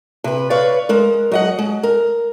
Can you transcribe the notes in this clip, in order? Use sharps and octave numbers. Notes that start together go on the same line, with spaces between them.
C3 B4
B4 C#5 D5 F5
G#3 A#4
F#3 D#5 F#5
G#3
A#4